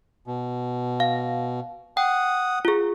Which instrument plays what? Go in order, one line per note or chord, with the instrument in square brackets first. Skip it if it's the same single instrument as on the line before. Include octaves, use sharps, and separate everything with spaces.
[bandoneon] B2
[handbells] F5
[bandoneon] F#5 D#6 [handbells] G5
[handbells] F4 G#4